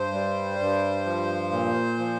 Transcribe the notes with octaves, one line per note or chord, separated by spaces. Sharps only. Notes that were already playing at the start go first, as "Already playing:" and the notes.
Already playing: G2 C5
G3
G2
F3
A#2
F3